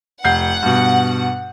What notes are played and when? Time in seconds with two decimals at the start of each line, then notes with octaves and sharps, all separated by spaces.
0.24 F1 F#5 G6 C7
0.62 G2 B2